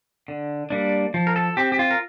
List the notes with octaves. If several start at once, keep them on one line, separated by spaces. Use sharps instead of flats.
D3
G3 A#3 D4
F3
A#4
A4
C4 G4
G4
F4
A#4